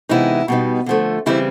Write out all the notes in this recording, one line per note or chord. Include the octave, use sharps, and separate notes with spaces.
C3 E3 G#3 B3 D#4 E4
B2 G3 B3 D#4
D3 F3 A3
C#3 E3 G3 C4 E4